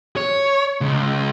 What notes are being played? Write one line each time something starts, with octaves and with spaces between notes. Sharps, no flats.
C#5
C#2